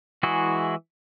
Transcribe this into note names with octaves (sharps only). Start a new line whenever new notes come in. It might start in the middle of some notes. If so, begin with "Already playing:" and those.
E3 G#3 E4 F#4 G#4